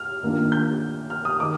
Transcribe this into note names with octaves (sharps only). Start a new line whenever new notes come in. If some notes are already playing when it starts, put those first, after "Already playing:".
Already playing: F6
D#3 A#3 D4 F4
G6
F6
D#6
D#3 D6